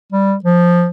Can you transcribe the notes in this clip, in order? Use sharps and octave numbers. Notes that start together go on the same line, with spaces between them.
G3
F3